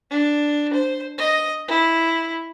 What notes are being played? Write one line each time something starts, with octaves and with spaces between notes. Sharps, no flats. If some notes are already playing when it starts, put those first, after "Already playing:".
D4
C5
D#5
E4